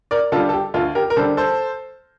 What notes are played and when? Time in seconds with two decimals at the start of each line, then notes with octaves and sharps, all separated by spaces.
0.11 A#4 D5
0.32 D3 F4 A4
0.36 G3
0.49 A4
0.53 G4
0.74 D2 F4 A4
0.95 G4 A#4
1.10 A#4
1.16 D3 G3 A4 C5
1.37 A4 C5